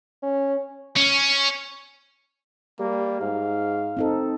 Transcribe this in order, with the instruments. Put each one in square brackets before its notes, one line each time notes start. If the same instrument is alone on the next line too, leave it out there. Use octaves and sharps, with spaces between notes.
[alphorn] C#4
[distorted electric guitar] C#4
[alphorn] G3 [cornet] A#3
[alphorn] G#2 [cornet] F5
[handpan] C4 D#4 A4